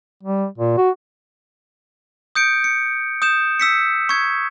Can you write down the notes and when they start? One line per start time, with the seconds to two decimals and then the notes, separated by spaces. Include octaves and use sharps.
0.23 G3
0.58 A#2
0.78 F#4
2.35 D#6 G6 C#7 D7
2.64 C#7
3.22 D#6 G6 E7
3.60 E6 B6 C#7
4.09 C#6 G#6